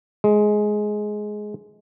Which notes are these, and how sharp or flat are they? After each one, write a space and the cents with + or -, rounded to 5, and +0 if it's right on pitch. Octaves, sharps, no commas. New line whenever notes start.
G#3 +10